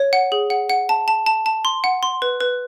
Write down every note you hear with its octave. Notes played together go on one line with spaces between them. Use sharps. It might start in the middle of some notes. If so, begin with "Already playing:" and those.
Already playing: C#5
F#5
G#4
F#5
F#5
A5
A5
A5
A5
C6
F#5
C6
B4
B4